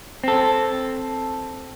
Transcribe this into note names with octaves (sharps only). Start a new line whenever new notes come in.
C4 A4